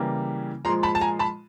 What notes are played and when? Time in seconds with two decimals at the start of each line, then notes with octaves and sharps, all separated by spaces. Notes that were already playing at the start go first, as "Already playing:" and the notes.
Already playing: C#3 E3 G3 A#3
0.65 A#2 F3 G#3 A#5 C6
0.83 A5 B5
0.95 A5
1.01 G#5 A#5
1.19 A5 B5